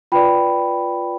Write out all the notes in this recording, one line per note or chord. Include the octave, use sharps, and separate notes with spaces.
F4 B4 D5 G5 B5